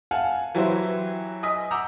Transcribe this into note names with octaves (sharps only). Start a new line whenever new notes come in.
F5 F#5 G#5 A5
E3 F#3 E4 G4 B4 C5
D#5 G#5 D#6 B6
F#5 A#5 D6 E6 G6